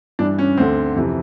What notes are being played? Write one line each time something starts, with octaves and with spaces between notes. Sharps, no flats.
G2 E3 D4
C#4
D2 D3 C4
F2 C3 E3